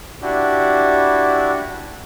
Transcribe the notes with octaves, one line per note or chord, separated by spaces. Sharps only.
D4 E4 F#4 G4